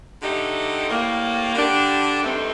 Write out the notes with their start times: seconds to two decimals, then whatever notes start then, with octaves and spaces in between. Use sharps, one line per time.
0.20 D3 A3 D#4 G4
0.87 A2 G3 A#3
1.54 D3 G3 D4 G4
2.21 G2 D3 A3 C4 D#4